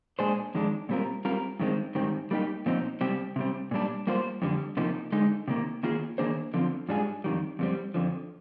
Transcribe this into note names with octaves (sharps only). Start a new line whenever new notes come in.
A#2 G#3 D4 G#4 C5
F2 D#3 G#3 D4
A#2 G3 C4 F4 A#4
G3 C4 F4 A#4
G2 D#3 G#3 C4
G#2 D#3 G3 C4
G3 A#3 D#4 G4
A#2 F3 C4 D#4
C3 G3 C4 G4
C3 G3 C4
A#2 G3 D4
G3 A#3 F4 C5
F2 D3 G3
C3 F3 A#3 D#4
D3 G#3 D#4
C3 D#3 A#3
D#3 A#3 F4 G#4
D#3 A#3 D4 G#4 C5
D3 F3 C4 F4
G#2 G3 D4 F4 G#4
F2 D#3 G3
F2 D3 G3 C4
F2 D3 F3